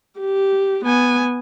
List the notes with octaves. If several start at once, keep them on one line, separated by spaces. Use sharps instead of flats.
G4
B3 G#5